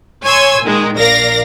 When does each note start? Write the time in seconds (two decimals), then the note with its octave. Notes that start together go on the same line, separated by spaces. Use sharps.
0.23 C#5 G#5 C6 E6 G#6
0.63 A#2 D#3 G#3
0.96 A#1 A#4 D5 F5 A#6